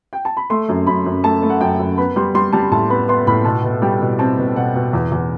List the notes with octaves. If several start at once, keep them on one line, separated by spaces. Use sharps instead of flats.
G5
A5
B5
A3 C6
F#2
F#2 B5
F#2
A3 A5
A3
F#5
F#2 G5
F#2
B3 B5
G3 C6
G3 C6
G3 A5
A2 A5
B3 B5
B3 C6
A2 B5
B2 A5
B2
G3 G5
B2
C4 A5
B2
B2 F#5
B2
E2
E2